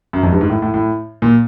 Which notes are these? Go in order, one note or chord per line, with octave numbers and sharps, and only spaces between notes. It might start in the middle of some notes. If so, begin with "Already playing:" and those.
F#2
F2
G2
G#2
A2
A2
A2
A#2